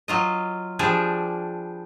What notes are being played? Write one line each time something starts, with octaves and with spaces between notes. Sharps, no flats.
F#3 F4 D#5
F3 G3 D4 G#4